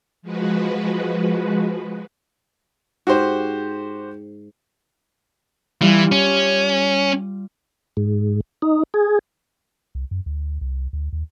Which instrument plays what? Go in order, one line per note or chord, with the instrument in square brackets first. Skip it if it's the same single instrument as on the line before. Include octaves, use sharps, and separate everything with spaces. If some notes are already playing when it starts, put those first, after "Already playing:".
[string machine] F3 G#3 F#4 B4
[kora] G#2 [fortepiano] F#4 G4 C5
[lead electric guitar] E3 [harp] G3 F4
[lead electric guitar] C#4
[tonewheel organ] G#2
D#4
G#4
[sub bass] C2
F#2
D2
C2
D2
D#2